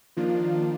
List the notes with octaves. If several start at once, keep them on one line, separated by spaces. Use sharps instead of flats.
D#3 F3 A#3 D4 F4